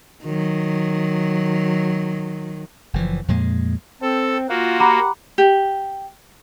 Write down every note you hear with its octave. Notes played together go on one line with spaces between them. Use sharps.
D#3 F#3
F#1 E3 F3
F2 A#2 G#3
C4 A4
A#3 F4 F#4
G4 F#5 A#5 B5 D6
G4